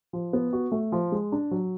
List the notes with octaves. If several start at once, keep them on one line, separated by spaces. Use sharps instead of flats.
F3
B3
F#4
A3
F3
G#3
D4
F#3